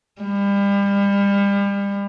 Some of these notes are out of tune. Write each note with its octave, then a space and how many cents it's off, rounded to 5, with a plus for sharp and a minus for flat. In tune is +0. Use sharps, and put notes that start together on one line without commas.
G3 +35